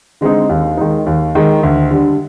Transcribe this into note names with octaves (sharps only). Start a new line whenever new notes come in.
D3 G#3 C4 D#4
D#2
D#3 G#3 D#4
D#2
D#3 G#3 D#4
D2
D3 G3